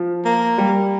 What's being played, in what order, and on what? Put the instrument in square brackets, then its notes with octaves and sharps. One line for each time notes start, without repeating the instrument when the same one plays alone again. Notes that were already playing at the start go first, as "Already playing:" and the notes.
Already playing: [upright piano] F3
[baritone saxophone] A#3
[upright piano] G3